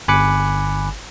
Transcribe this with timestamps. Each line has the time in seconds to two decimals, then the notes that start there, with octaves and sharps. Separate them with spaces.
0.08 G1 G#5 B5 D6 F#6 C#7